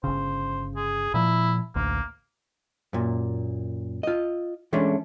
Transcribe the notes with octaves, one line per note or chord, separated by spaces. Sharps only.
G1 C#3 C5
G#4
A#2 F3 E4
A1 D2 A#3
F#2 A#2
F4 D#5
E3 G#3 A3 C#4 D4